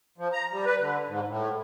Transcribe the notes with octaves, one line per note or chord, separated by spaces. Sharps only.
F3
A#5
G3
B4
D3
G#2
A2